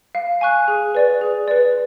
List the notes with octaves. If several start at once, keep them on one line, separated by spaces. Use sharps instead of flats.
F5
G#5 C#6 F#6
G#4
B4 D5
G#4
B4 D5